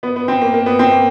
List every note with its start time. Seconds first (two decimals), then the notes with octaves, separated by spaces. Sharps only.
0.03 B3
0.16 B3
0.28 C4
0.41 A#3
0.54 A#3
0.66 B3
0.79 C4
0.91 A#3